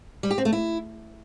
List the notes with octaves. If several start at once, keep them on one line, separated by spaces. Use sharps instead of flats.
G3
G4
C4
A3
E4